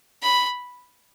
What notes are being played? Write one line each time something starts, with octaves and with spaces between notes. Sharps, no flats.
B5